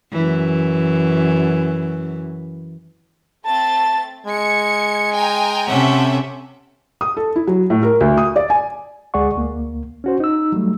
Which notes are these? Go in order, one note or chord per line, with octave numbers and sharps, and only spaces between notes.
F#2 E3
A3 C4 A5 A6
G#3 G#6 C#7
G5 G#5 A#5
C3 C#4 A4 E5 F#5
D#6
A4
E4
F#3
A2
A#4
D2
D#6
D5
G#5
D2 G#3 G#4 D5 F#5 C#6
D2 A#3
C#4 F#4 C5
D#4 E6
F#3 G3 A3